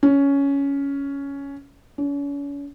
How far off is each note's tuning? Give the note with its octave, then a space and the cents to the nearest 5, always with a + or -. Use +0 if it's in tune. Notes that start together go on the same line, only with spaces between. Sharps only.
C#4 +10
C#4 +40